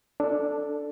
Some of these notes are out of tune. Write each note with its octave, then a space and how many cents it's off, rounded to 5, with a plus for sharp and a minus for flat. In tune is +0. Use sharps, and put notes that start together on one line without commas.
D4 +0 A4 +10